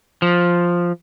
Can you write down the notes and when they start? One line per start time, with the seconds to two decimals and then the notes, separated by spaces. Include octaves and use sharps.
0.22 F3